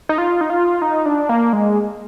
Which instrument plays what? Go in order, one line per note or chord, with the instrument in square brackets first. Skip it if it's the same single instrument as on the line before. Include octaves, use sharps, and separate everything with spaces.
[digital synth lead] D#4
F4
D#4
F4
D#4
D4
A#3
G#3